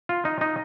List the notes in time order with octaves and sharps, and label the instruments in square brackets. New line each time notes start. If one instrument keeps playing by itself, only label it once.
[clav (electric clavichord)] F4
D#4
D#4